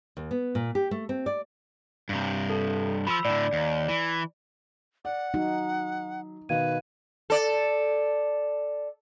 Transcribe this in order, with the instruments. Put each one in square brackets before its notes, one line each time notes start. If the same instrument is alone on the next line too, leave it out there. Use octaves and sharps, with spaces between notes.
[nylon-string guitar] D#2
B3
A#2
G4
A3
C4
D5
[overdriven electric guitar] G2 C3
[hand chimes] A4
[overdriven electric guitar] F3 [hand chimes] B5 E6
[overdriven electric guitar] A2 D3 [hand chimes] D5
[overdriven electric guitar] D#2
E3
[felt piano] D5 [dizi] F#5
[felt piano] F#3 [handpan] D#4
[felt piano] B2 D#3 [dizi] B4 [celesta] F5 G#6 D#7
[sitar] A4 D5